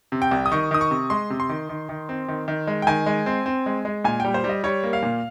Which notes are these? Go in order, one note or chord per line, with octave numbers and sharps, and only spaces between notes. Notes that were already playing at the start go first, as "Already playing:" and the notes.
C3
G5
C2
D#6
D#3 C#6
D#3 D#6
C#6
C3
G#3 C6
C3
C6
D#3
D#3
D#3
C4
D#3
D#3
G#3
G5
D#3 G#5
G#3
C4
C4
G#3
G#3
A#2 G#5
G3 G5
C5
G3
D#5
G3 C#5
A#3
F5
A#2